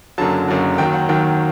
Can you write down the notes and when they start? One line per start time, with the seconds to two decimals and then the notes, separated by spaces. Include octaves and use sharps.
0.18 F#1 F#2 D3 F#3 A5
0.48 F#1 F#2 D3 F#3
0.78 D#2 D#3 F#3 G5
0.93 F#5
1.09 D#2 D#3 F#3 G5